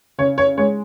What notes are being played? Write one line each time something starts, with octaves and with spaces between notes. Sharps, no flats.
C#3 C#5
C#5
G#3 C#5